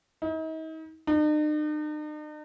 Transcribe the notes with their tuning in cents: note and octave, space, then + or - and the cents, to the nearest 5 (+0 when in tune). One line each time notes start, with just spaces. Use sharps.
D#4 +40
D#4 -45